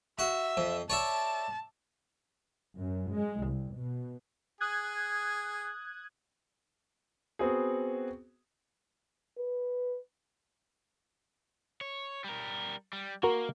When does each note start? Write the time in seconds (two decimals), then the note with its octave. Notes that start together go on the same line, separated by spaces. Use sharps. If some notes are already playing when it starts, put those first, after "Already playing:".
0.19 F#4 E5
0.57 F2
0.90 C#5 D5 E5 A5
2.78 F#2
3.11 G#3
3.43 C2
3.74 B2
4.61 G#4 D#6 F#6 G#6
7.39 B3 C4 F#4 G#4
9.39 B4
11.81 C#5
12.24 G3 A#4
12.93 G3
13.23 A#3 F#4 A#4